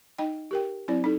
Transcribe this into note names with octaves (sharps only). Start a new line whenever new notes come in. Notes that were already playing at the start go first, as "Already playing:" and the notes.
D#4 D#5 G5
G4 A#4 G5
F#3 C4 E4 D5
D#4 A4